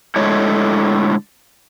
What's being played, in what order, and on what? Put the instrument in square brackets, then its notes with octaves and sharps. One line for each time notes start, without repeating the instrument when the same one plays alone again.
[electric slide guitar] A2 D3 G#3 A3 C#5